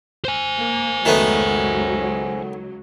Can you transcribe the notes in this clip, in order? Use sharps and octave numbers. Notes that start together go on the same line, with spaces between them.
C5 G#5
A#3
C#2 D#3 F#3 A3 B3